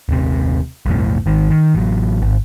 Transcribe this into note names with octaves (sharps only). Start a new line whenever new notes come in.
D#1 C3
B1 F2 A2
G#1 D#3
D#3
A1 F#3
G#1